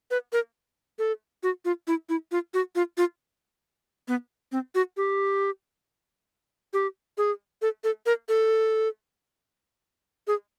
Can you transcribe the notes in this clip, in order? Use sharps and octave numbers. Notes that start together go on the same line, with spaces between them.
B4
A#4
A4
F#4
F4
E4
E4
F4
F#4
F4
F4
B3
C4
F#4
G4
G4
G#4
A4
A4
A#4
A4
G#4